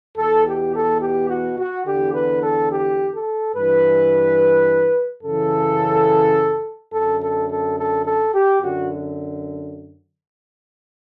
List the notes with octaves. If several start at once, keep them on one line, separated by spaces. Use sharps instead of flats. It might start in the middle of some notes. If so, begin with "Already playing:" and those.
E2 B2 A4
G4
A4
G4
F#4
F#4
E2 D3 G4
B4
A4
G4
A4
G2 E3 B4
F#2 C#3 E3 A4
F#2 D3 A4
A4
A4
A4
A4
G4
F#2 D3 F#4